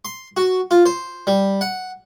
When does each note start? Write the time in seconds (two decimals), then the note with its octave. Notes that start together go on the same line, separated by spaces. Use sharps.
0.05 C6
0.37 F#4
0.71 F4
0.86 C5
1.27 G3
1.61 F#5